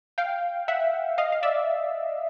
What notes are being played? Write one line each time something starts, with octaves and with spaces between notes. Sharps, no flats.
F5 G5
E5 F#5
D#5 F5
F5
D5 E5